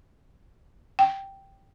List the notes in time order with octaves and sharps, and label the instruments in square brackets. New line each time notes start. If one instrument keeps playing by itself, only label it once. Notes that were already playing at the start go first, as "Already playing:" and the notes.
[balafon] G5